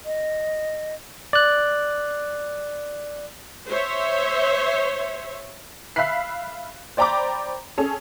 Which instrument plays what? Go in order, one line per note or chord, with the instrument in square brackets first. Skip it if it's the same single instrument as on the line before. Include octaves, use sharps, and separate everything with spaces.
[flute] D#5
[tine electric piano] D5 F#6
[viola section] C5 C#5 E5
[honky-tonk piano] E5 F5 B5 F#6 B6 C7
C5 D5 G5 A#5 B5 D6
C#4 G#4 A4